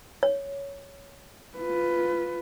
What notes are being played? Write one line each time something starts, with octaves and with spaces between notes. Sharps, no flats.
C#5
F4 B4